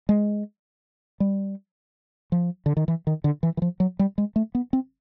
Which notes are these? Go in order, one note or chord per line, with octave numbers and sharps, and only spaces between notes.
G#3
G3
F3
D3
D#3
E3
D#3
D3
E3
E3
F3
F#3
G3
G#3
A3
B3
C4